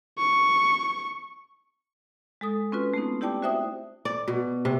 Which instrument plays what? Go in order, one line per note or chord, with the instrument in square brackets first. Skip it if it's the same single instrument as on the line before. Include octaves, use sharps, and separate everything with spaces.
[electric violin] C#6
[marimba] G#3 A4 D#6
C4 C#4 F4 F#4 B4
A3 B3 C4 D#4
E4 G4 D5 G5 A5 D6
F#4 C5 E5 G5 D#6
[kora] D5
B2
C3